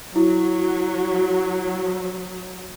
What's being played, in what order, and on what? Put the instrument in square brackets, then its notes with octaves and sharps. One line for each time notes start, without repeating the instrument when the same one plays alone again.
[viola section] F#3 [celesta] E4 [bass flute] F#4